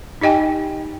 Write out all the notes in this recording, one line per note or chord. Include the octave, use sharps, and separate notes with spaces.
D#4 G4 D#5 G5 G#5